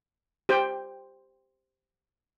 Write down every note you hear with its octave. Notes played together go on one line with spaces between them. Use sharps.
G4 C5 G5